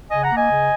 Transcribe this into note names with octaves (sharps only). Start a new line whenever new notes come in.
C#3 D#5 G#5
F#5 A#5
A#3
D#5 G#5
C#3